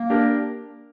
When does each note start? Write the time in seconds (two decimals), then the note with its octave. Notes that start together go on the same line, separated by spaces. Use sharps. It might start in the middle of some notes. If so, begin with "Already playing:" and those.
Already playing: A#3
0.10 D4 G4 A#4